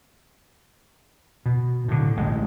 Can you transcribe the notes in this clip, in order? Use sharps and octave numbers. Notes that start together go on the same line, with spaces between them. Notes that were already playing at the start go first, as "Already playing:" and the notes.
B2
A2 D3
A1 G#3